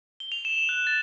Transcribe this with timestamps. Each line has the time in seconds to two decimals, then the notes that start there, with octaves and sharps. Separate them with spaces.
0.20 G7
0.32 F7
0.45 E7
0.69 F#6
0.87 A6